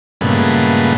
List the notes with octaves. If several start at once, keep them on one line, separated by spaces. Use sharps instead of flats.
G2 A#2 C#3 G#3 A3 B3